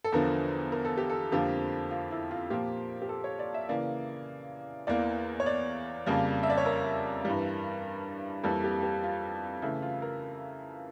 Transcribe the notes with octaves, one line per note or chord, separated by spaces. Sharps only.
A4
E2 D3 F3 A#4
A#4
A4
G4
A4
F2 D3 F3 A#3 G4
F4
E4
F4
A#2 F3 A#3 G4
G4
A4
C#5
D5
E5
C#3 E3 A#3 D5
E2 E3 A#3 D5
C#5
D5
F2 C#3 G3 A#3
E5
D5
C#5
A#4
G2 E3 G3
F2 E3 G3 A#3 A4
G4
G4
F4
C#3 E3 A3 E4
F4
A#4